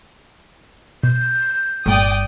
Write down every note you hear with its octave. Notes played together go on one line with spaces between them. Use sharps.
B2 G6
G1 A#2 G3 A3 D5 G5 D#6